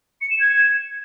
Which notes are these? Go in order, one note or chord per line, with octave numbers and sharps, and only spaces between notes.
C#7
E7
G#6